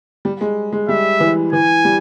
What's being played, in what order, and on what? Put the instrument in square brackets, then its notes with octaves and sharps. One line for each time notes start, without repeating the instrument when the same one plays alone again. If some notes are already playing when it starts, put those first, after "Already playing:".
[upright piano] G3
G#3
G#3
[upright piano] G3 [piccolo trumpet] E5
[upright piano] E3
[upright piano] E3 [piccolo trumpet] G#5
[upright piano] G3